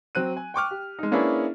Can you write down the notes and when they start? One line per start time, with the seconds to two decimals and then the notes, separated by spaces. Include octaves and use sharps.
0.15 F#3 C4 F#6 D#7
0.37 G#5
0.54 G5 C#6 D6 F6
0.71 G4
0.99 G#3 D#4
1.12 A#3 C#4 D4 E4 G#4 B4